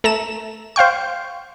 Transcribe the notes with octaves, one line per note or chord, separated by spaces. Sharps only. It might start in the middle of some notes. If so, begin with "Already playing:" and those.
A3 A#5 E7
C5 F5 G5 C#6